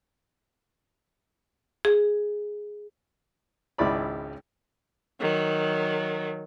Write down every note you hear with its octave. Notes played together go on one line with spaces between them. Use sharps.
G#4
G#1 C#2 E4 D5 B5
D#3 F#3